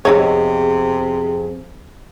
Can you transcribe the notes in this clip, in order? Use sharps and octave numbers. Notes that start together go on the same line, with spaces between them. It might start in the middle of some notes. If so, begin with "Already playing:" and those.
F2 C3 B3 D#4 G#4 C#5